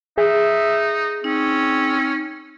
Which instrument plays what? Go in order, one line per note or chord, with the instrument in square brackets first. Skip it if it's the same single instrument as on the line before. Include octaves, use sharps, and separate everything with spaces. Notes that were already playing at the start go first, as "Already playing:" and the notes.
[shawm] D#4 [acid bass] G#4 [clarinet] E5
[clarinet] C4 [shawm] C#4 [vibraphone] D#4